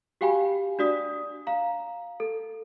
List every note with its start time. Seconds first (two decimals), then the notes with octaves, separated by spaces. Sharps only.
0.21 F#4 G4 F5 G5 G#5 B5
0.79 D4 F#4 D5 D#6 B6
1.47 F5 A#5
2.20 A4